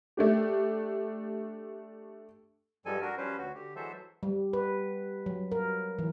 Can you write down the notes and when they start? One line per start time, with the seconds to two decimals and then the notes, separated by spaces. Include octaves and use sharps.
0.17 A3 D4 G4
2.86 G2 F3 G3 G#3 A4 G#5
3.02 D4 F#4 A#4
3.17 F3 G3 C#4 B4 C5
3.37 D2 F#4
3.54 D3 G4
3.76 E3 F#3 G#3 A4 C5 E5
4.23 G3
4.53 B4
5.26 F#3
5.52 A#4
5.99 E3